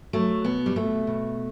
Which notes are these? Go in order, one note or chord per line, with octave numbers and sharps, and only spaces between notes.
F#3 A3
B2 B3
G3
B2 A3
B2